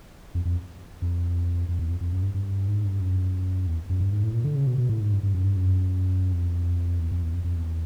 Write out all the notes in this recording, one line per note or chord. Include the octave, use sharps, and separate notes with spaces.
F2
F2
F2
F2
E2
F2
F2
F#2
G2
G2
G#2
G2
F#2
E2
F#2
G2
G#2
A2
A#2
D3
C#3
B2
B2
A2
G#2
G2
G2
F#2
G2
F#2
F2
E2
F2
E2
F2
F2
E2